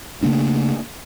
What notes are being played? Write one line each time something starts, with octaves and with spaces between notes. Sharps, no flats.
C#3 A3 A#3 D4